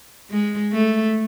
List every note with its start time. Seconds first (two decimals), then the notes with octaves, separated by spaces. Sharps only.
0.30 G#3
0.73 A3